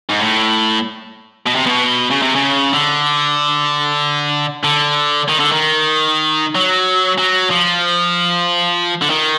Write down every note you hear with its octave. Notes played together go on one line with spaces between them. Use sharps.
G#2
A2
B2
C3
B2
C#3
C3
C#3
D3
D3
D#3
D3
D#3
F#3
F#3
F3
D3
D#3